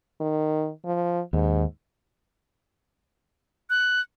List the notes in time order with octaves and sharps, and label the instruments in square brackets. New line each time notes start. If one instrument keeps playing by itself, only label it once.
[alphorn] D#3
F3
[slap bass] D#2 [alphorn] G#2
[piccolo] F#6